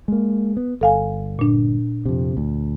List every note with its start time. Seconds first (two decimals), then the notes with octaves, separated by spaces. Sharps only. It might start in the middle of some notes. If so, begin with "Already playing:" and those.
0.08 G#3 A#3
0.57 B3
0.81 G1 A4 F5 G#5
1.39 A#2 D4
2.06 F2 C3
2.37 D2